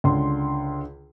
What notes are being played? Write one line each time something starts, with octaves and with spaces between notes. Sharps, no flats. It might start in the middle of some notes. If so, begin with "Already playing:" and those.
C#2 D3 C6